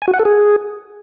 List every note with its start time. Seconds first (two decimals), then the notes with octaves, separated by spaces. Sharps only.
0.02 G#5
0.08 F#4
0.13 F#5
0.19 A4
0.25 G#4